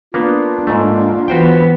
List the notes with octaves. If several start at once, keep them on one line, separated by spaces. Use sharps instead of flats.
A#3 B3 D4 F4
G#2 A3 A#3
E3 B3 F#4 C5 G5